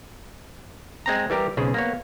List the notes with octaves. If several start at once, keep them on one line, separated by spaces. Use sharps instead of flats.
G#3 C4 A#5
E3 G3 G4 A#4
B1 C#3 G#4 C5
A#3 B3 C#5